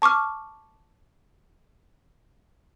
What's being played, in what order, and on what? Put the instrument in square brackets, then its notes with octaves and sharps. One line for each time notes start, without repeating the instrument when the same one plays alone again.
[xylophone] A5 C#6 D6 F6